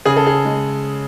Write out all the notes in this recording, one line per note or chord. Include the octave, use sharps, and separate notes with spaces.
C#3 G#4
A4
G#4
G#3